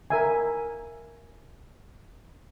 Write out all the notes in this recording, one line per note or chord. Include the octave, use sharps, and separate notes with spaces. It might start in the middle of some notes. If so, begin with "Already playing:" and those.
A#4 E5 G#5